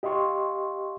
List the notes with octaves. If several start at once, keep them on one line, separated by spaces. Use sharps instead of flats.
G4 D#5 F5 C6 C#6